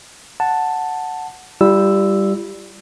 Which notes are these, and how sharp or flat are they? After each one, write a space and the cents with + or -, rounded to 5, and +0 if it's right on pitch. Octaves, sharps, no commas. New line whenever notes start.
F#5 -5 A5 +5
G3 +0 F4 -45 E6 +0